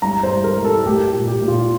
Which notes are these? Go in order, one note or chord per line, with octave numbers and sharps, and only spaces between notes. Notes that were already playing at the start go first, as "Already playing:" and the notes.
G2 A#5
C5
G3
A#4
G3
A4
A3 G4
G4
A#2
G4
A#2
F4